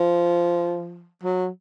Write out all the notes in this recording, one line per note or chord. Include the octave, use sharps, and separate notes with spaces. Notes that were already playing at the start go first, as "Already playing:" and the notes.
Already playing: F3
F#3